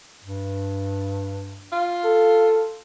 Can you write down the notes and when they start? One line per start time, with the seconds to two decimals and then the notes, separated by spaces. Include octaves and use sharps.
0.23 G2
1.72 F4
2.04 A4